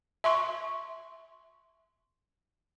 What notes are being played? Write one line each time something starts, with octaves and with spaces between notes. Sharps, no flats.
E5 C6 C#6